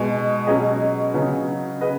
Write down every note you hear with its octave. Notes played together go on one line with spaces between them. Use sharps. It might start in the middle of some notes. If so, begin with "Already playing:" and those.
Already playing: B2 G#3 D#4
B2 F#3 C#4 G#4 D#5
C#3 F#3 B3
B3 G#4 B4 D#5